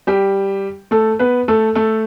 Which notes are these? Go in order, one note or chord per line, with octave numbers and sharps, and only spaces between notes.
G3 G4
A3 A4
B3 B4
A3 A4
A3 A4